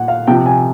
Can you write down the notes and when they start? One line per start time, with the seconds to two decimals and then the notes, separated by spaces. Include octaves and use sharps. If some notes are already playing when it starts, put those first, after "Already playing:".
Already playing: A#2 F#5
0.08 F5
0.27 C3 F3 G5
0.46 G#5